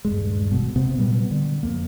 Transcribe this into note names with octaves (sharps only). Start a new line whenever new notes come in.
D#1 G2 G#3
G#1 B2
C3 B3 C4
A#2 F#3 G3 B3
D3
F2 A#3